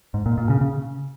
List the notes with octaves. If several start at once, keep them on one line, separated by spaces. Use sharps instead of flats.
G#2
A#2
A#2
C#3
C#3